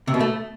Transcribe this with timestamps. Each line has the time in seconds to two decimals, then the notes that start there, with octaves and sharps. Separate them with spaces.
0.07 C3
0.14 B2
0.20 A3